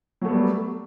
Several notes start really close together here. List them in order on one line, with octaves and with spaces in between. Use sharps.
F#3 A3 B3 G3